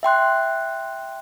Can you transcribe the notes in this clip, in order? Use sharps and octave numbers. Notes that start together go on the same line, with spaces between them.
E5 G5 C6 F#6